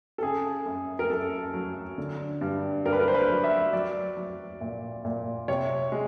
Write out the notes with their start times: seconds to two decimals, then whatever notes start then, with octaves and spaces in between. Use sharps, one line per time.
0.18 A4
0.22 C#3 G#4
0.66 F#2
0.99 A#4
1.10 F#2 A4
1.54 F#3
1.98 D3
2.41 G2
2.85 G2 A#4
2.93 B4
3.00 A#4
3.08 C5
3.14 B4
3.29 F#3
3.44 E5
3.73 F#3 D5
4.17 F#3
4.61 A#2
5.05 A#2
5.48 C3 C#5
5.92 G#3